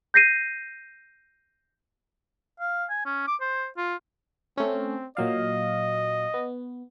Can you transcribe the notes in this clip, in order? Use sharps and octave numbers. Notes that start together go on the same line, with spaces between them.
G6 A#6 C7 D#7
F5
G#5
C#4
D6
C5
F4
A3 C4 C#4
A#2 F#3 D#5 F5
B3